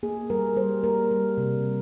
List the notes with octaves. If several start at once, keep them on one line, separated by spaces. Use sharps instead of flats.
A#3 G#4
G3 A#4
G3 C5
A#3 A#4
G3
C3
G3